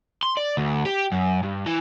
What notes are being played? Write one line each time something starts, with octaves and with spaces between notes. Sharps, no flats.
C6
D5
D2
G4
F#2
G2
E3